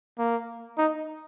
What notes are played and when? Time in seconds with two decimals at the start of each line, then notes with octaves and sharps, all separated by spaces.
0.19 A#3
0.78 D#4